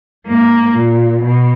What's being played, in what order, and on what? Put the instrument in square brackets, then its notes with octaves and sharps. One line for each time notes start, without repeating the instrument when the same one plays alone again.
[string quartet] G#2 [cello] A#3
[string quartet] A#2
B2